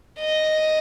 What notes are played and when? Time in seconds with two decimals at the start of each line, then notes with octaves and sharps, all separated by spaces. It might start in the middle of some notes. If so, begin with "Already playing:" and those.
0.19 D#5